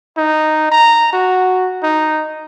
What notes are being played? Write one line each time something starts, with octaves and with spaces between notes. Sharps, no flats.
D#4
A#5
F#4
D#4